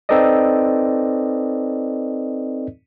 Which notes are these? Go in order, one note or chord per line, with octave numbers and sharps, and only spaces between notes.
C4 D#4 A4 B4 D5 D#5